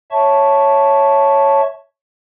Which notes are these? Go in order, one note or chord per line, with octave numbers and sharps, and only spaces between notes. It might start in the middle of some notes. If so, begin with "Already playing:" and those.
C#5 E5 A5 C#6